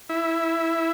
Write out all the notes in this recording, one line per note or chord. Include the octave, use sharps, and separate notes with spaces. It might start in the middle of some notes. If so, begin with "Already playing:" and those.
E4